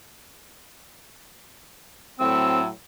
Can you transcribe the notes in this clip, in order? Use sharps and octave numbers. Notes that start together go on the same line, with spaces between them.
A2 F#3 C4 E6